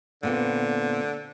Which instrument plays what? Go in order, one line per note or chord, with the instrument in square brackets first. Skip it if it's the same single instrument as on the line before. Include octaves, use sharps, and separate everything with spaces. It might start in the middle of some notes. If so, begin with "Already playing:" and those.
[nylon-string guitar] A#2 B3 C4 [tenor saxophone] D3